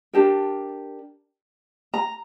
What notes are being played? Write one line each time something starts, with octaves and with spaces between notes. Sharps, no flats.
D4 G4 A#4 A5
A#5